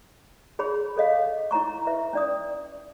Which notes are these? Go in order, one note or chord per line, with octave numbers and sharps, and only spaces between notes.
G#4 C#5 B5
A4 C#5 D#5 F5
E4 C#5 A#5 C#6
B4 E5
C#4 D5 D#6